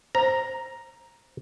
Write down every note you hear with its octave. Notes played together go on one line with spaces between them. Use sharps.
C5 A#5